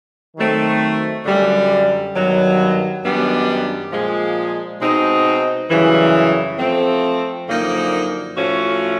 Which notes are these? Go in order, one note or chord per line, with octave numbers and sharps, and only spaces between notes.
D#3 F#3 A3 C4
F#2 D3 G3
G2 D#3 F#3 B3
F#2 D#3 G3 B3 D4
A#2 F3 G#3
B2 G#3 C4 D#4
F#2 C#3 E3 G3
F3 A3 C4
F#2 D3 F3 A#3 D#4
A2 F3 A3 C#4 F#4